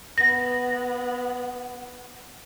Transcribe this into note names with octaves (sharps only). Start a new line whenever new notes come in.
B3 A#6